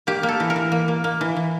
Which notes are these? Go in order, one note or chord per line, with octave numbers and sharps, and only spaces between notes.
A#3 G4
A#3
A4
E3
A#4
E3
A#3
A#3
A#3
E3
E3